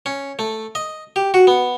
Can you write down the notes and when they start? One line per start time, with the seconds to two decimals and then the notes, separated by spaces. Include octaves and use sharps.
0.06 C#4
0.39 A3
0.75 D#5
1.16 G4
1.34 F#4
1.47 B3